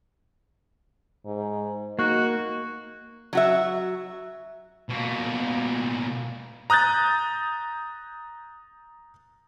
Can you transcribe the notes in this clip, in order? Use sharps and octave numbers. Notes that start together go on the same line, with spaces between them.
G#2
A#3 D#4 F#4
F#3 F#4 E5
B2 A#3
A#5 D#6 F#6 G6 A6